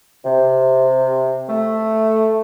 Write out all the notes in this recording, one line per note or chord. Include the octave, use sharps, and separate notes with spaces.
C3
A3